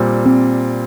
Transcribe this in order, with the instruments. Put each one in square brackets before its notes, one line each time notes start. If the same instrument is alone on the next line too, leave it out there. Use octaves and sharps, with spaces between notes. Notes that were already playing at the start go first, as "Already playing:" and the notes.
Already playing: [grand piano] A#2 G3 C4
[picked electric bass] C4